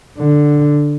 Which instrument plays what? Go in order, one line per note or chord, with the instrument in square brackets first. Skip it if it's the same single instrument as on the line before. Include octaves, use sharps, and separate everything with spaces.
[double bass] D3